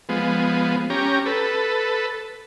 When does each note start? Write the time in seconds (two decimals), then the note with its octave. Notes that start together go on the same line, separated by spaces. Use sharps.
0.09 F3 G#3 B3
0.90 C#4 G4 A#5
1.26 A4 B4